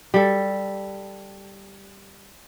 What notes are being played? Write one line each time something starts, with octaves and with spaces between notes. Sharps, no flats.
G3 A4